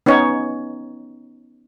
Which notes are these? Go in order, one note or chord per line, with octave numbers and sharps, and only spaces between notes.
B3 C#4 D#4 C#5